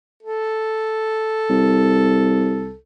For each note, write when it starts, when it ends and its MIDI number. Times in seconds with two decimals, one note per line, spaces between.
0.23 2.76 69
1.50 2.79 36